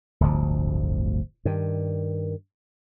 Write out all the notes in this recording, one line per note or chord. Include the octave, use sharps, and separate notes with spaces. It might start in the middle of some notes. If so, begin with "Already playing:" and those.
D1 G1 D2 F3
G2 D#3